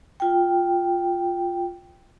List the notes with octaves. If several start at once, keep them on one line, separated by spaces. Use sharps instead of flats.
F4 G5